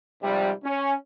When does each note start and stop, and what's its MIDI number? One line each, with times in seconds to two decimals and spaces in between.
0.22 0.50 44
0.22 0.50 48
0.22 0.50 53
0.22 0.50 55
0.63 0.93 61